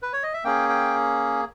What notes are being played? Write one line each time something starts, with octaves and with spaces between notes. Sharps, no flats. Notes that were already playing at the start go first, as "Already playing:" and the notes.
B4
C#5
D#5
E5
A#3 C#4 G#4 G5
G5